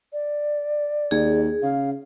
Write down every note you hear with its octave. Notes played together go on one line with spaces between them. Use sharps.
D5
D#2 G#4
C#3 F5